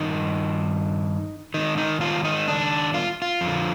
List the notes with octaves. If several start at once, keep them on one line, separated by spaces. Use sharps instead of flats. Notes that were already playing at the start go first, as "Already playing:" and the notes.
Already playing: G2 D#3 D#4
G#2 D#3 D#4
D#4
F4
D#4
D4
F4
F4
F2 D3